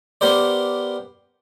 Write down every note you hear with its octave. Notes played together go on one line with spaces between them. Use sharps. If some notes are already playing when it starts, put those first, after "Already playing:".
B3 G4 A#4 C5 D5